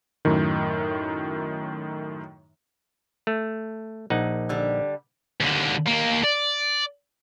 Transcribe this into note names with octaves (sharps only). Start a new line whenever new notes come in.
F#2 A2 D#3
A3
A#1 D#4 F#5
D3 G3
D#2 D3
D#2 A#3
D5